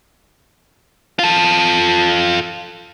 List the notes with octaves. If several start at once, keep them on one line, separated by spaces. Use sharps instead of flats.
F4 A4